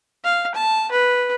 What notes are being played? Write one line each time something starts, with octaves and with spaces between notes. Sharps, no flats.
F5
A5
B4